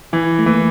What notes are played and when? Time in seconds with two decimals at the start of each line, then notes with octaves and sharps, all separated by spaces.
0.13 E3 E4
0.39 A3
0.46 E3 A#3